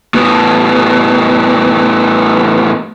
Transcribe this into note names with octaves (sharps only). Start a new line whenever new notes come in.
A2 B3